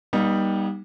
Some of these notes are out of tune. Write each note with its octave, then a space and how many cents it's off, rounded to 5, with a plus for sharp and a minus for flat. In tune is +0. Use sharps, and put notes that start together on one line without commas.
G3 +0 B3 -45 D#4 +0